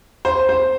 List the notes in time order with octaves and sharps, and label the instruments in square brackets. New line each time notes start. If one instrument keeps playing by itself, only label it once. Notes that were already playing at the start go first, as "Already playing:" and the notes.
[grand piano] C5
C5